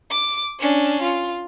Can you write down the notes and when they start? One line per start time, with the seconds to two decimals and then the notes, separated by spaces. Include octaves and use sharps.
0.11 D6
0.60 C#4 D4
1.02 F4